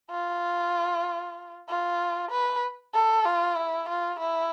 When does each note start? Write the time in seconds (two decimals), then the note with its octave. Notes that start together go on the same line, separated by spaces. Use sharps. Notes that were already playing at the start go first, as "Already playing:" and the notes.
0.11 F4
1.68 F4
2.31 B4
2.94 A4
3.25 F4
3.56 E4
3.89 F4
4.19 E4